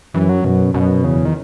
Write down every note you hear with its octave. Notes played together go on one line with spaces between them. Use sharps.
F#2 E3
F#3
F#2 B2
F#2 B2
E2 C#3
D#3